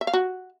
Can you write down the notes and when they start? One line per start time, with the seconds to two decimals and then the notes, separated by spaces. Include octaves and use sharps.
0.01 E5
0.07 F5
0.13 F#4